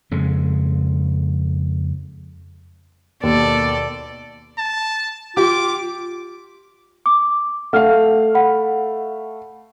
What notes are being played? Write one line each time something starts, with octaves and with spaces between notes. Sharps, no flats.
F2 C#3 G#3
D#2 B2 A4 D5
A5
F4 G4 D6
D6
A3 F5 F#5 F6
F#5 B5